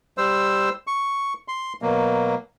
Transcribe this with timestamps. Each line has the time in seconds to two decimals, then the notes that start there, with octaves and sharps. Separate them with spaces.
0.18 G3 C5 E6
0.87 C#6
1.48 C6
1.82 B2 F#3 A#3